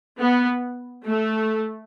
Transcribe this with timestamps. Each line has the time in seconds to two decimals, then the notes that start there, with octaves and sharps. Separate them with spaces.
0.19 B3
1.06 A3